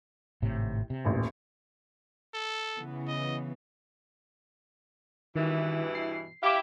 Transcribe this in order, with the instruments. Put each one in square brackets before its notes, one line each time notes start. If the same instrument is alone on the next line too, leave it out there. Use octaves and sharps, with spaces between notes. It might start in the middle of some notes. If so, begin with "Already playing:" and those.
[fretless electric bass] G#1 A2 C3
C3
[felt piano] D#1 A1
[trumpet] A4
[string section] C#3 E3 B3
[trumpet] D#5
[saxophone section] G2 B2 E3 [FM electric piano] D#3
[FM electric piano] C7
[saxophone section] E4 G4 [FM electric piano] F5 D6